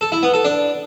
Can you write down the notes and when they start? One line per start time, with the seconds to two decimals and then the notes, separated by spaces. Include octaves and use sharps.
0.01 A4
0.12 E4
0.23 B3
0.34 A4
0.44 D4